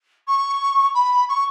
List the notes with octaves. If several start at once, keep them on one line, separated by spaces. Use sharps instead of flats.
C#6
B5
C#6